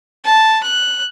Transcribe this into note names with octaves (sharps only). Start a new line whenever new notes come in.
A5
F#6